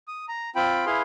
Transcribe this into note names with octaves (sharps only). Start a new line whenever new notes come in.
D#6
A#5
C4 F4 G5 B5
E4 G#4 B4 F5 C6